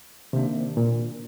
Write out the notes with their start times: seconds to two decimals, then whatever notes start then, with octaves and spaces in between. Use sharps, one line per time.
0.33 C3 D#3 A#3 D4
0.77 A#2